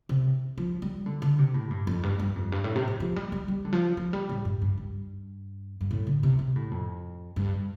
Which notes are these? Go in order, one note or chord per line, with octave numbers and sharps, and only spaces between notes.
C3
F3
G3
D3
D3
C3
A2
G2
F2
G2
G2
F2
G2
A2
C3
F3
F3
G3
G3
G3
D3
F3
F3
G3
A2
G2
G2
G2
G2
A2
D3
C3
C3
A2
F2
G2